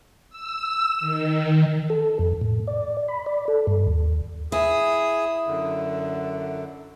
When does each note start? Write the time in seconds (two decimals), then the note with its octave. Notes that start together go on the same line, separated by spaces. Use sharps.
0.30 E6
1.00 D#3
1.90 A4
2.19 F2
2.41 A2
2.67 D5
3.08 B5
3.26 D5
3.48 A4
3.67 G2
3.87 D#2
4.52 E4 G#4 D#6
5.47 F#2 D3